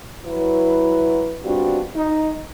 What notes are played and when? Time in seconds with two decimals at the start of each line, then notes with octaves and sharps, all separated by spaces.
0.25 F#3 E4 B4
1.44 G3 B3 C4 D4 F4 F#4
1.96 D#4